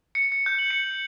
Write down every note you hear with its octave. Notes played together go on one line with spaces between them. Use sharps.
C#7
C#7
G6
F#7
C#7